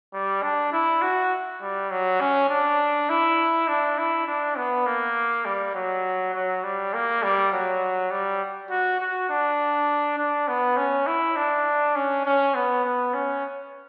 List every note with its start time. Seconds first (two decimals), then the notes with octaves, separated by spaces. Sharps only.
0.14 G3
0.43 D4
0.73 E4
1.02 F#4
1.61 G3
1.91 F#3
2.20 C#4
2.50 D4
3.09 E4
3.68 D4
3.98 E4
4.27 D4
4.57 B3
4.86 A#3
5.45 G3
5.75 F#3
6.34 F#3
6.63 G3
6.93 A#3
7.23 G3
7.52 F#3
8.11 G3
8.70 F#4
9.00 F#4
9.30 D4
10.18 D4
10.48 B3
10.77 C#4
11.07 E4
11.36 D4
11.95 C#4
12.25 C#4
12.55 B3
12.84 B3
13.14 C#4